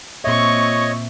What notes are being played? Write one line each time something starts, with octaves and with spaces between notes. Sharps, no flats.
A#2 C4 C#5 D#5 E5 C#6